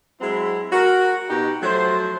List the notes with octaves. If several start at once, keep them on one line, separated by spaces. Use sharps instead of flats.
F#3 G#3 C4 E4
F#4 A#4
B2 D#4 G4 G5 A#5
F3 F#3 A3 F#4 C5